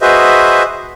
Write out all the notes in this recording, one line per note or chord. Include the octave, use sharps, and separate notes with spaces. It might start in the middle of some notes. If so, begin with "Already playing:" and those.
F#4 G#4 B4 C5 D#5 E5